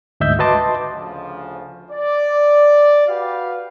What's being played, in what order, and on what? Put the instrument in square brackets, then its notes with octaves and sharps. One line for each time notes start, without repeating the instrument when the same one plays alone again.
[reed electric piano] D2 G#2 D#5 E5 G6
F#4 B4 D#5 A5 C6 D6
[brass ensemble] D2 C#3 F3
D5
F#4 G4 B4 F5